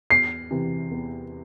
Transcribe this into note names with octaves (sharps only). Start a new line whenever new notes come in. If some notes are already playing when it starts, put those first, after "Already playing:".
E2 C7
C3 E3
E2